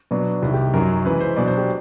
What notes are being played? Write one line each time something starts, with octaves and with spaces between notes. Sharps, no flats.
B2 F#3 B3 D4
C2 C3 D#3
G4
F#2 D#3 F#3 A#4
C#3 E3 G#3 B4
C5
B2 F#3 B3 D4 D5
C5
G4